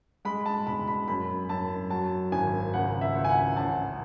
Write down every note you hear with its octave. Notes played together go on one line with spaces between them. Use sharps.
G#3 B5
A5
E1 B5
B5
F#2 B5
F#2 A5
F#3 A5
G#1 G#5
C#2 F#5
E5
C#2
G#5
F#5
A1 A5